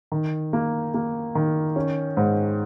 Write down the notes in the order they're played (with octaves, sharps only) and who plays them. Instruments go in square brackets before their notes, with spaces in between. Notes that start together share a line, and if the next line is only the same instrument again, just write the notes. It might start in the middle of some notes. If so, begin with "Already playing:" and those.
[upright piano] D#3
A#3
A#3
D#3
C#4
G#2